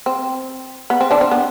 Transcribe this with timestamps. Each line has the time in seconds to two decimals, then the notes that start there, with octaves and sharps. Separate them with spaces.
0.06 C4
0.90 B3
1.01 C4
1.11 D3 D4
1.21 C4
1.31 B3